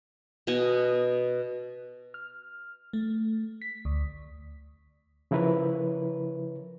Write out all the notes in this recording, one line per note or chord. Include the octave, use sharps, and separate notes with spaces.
B2 D#5 F#5 G#5
F6
A3
B6
D2
C#3 F3 E4 A#4 B4 C#5